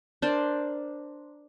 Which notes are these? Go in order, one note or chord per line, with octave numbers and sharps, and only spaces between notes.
D4 A#4 C5 D5